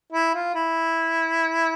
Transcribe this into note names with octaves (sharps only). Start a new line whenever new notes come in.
E4
F4
E4